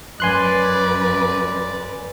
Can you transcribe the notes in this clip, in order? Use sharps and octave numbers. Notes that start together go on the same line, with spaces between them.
F#2 B4 D5 G#5 C6 F#6